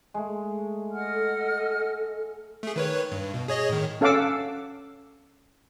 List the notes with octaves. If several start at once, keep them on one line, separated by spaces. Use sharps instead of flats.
G#3 A3
D#5 F#5 F6
A4
A3 G#4
D#3 B4 C#5
G2
B2
G#4 C#5 D#5
A2 D#3
C#4 A4 F5 F#5 D6 E6